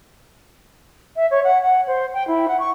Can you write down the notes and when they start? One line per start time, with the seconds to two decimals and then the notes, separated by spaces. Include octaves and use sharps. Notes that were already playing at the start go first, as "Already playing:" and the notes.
1.16 E5
1.30 C#5
1.44 F#5
1.61 F#5
1.87 C5
2.13 G5
2.27 E4
2.48 F#5
2.59 C#6